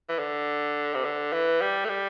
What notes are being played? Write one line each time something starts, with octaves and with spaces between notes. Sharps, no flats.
E3
D3
C3
D3
E3
G3
A3
G3